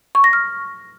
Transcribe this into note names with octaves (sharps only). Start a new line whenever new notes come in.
C#6
A#6
F6